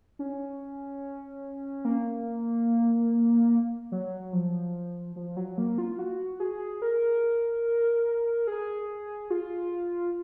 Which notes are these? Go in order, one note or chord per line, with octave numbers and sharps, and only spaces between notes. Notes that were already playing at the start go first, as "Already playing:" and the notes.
C#4
A#3
F#3
F3
F3
F#3
A#3
F4
F#4
G#4
A#4
G#4
F4